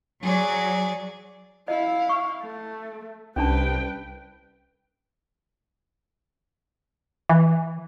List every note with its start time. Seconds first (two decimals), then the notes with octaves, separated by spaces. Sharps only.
0.23 F#3 G#4 D5
1.68 E4 D#5 F5
2.09 C#6
2.41 A3
3.36 C2 C#4 D4 B4 G5 A5
7.29 E3